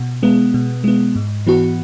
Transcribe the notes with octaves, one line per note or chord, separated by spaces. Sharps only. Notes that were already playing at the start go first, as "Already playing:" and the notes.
Already playing: B2
G#3 B3
B2
G#3 B3
G#2
E3 B3 F#4